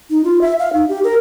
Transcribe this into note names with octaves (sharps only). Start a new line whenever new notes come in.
D#4
F4
E5
F5
D#4
G4
A#4